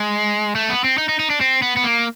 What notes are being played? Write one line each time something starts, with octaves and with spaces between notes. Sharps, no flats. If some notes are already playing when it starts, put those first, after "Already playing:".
Already playing: G#3
A3
B3
C4
D#4
D#4
D#4
D4
C4
B3
B3
A#3